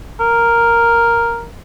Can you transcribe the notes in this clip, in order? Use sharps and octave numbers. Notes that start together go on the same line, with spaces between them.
A#4